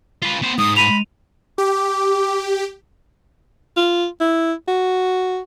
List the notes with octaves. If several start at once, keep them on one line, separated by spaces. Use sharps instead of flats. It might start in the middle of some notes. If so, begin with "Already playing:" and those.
F4 B4
B3 C5
G#2 D#6
B5 D#7 F7
G4 D6
F4
E4
F#4